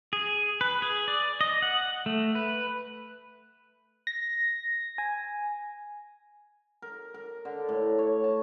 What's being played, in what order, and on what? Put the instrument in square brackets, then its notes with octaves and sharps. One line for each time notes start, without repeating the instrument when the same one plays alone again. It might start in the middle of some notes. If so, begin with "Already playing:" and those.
[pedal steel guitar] G#4
B4
G#4
D5
D#5
F#5
A3
B4
[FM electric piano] A#6
G#5
[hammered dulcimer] A#4
A#4
D3
A2
C#5
A5